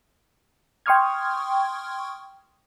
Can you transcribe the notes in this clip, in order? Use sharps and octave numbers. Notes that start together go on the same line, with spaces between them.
G5 C6 C#6 D#6 F6 G#6